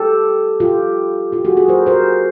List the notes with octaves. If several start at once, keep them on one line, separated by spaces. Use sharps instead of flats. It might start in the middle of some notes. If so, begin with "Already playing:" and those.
Already playing: G4 A4
F4 G4
F4 G4
F#4 G#4
F#4 G#4
A#4 C5
A#4 C5